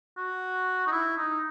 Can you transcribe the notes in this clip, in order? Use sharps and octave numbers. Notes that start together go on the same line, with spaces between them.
F#4
D#4
E4
D#4